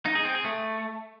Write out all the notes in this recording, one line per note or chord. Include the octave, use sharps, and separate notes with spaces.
D#4
G#4
C4
G#4
A3